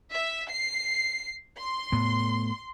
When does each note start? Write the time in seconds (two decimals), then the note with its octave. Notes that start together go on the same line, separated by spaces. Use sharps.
0.12 E5
0.50 C7
1.56 C6
1.92 A2 B3